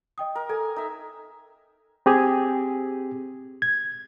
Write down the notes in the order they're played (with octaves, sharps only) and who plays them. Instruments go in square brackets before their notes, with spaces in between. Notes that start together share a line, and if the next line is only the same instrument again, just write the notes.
[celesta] D#5 G5 D#6
[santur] A#4
[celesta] A4 [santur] G#5
[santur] D#4 E5
[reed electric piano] C4 G4 G#4
G#6